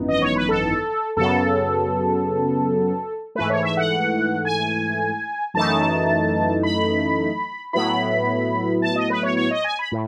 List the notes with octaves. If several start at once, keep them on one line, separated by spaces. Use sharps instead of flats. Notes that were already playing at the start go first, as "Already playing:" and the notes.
Already playing: G#1 F#2 E3 B3 D#4
D#5
C#5
B4
A4
F#2 C#3 F#3 B3 A4
G#2 E3 A3 B4
C#5
E5
F#5
G#5
F#2 E3 A3 D#4 A5
B5
A2 F#3 B3 E4 B5
A5
D#5
B4
C#5
C#5
D#5
G#5
B5
A2